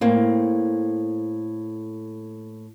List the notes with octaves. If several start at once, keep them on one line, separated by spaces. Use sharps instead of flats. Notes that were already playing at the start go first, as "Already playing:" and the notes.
A2 A#3 C4